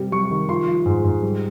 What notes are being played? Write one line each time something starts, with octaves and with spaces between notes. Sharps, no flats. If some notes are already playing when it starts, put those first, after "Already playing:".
Already playing: C3 G3
G3 C#6
D#3
F3 C6
F3
G#2
G#2
G3